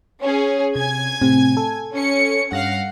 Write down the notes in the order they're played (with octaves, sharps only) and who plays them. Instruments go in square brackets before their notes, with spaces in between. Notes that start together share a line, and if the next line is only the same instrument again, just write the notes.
[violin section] C#4 G#4
[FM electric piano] C3 [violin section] G#5 G#6
[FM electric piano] A2 C3 C4
A4
[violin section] C#4 C#7
[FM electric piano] G2 A#6 [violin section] F5 F#5